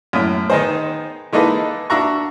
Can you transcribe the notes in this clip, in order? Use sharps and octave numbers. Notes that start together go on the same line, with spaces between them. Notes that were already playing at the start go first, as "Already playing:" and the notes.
F#2 A2
D#3 B3 D#4 G#4 C5
E3 G#3 A#3 D#4 A4 B4
D4 F#4 E5 F#5 A#5 C#6